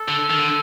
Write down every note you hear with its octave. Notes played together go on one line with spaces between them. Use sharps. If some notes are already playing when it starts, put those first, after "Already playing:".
Already playing: A4
D3
D#3
D3